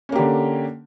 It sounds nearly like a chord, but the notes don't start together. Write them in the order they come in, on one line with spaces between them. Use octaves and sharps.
C#4 A#3 G4 D3